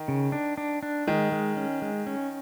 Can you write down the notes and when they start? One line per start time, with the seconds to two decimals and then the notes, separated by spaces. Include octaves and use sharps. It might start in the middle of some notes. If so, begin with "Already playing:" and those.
Already playing: D#3
0.08 C#3
0.32 D4
0.58 D4
0.83 D4
1.07 D#3 G#3
1.32 G#3
1.57 C#4
1.82 G#3
2.07 C#4